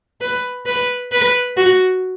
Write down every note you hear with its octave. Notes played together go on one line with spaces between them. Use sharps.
B4
B4
B4
F#4